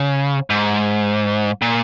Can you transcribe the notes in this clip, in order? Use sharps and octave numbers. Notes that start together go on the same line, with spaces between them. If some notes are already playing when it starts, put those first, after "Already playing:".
Already playing: C#3
G#2
A#2